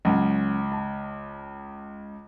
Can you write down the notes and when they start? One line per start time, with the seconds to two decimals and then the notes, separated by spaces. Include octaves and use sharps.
0.05 C#2 F#3 C#4
0.72 A5